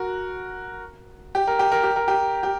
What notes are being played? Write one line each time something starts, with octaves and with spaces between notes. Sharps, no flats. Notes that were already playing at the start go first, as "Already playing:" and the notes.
Already playing: F#4 A#4
G4
A#4
G4
A#4
G4
A#4
G4
G4